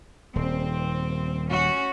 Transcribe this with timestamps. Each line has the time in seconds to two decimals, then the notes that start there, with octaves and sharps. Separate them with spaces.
0.35 D#1 C4
1.49 C#4 F#4